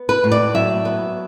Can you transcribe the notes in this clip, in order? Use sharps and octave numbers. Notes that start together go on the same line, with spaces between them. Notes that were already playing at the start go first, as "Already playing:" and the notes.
Already playing: B3
B4
A2
D5
F#3 E5
B3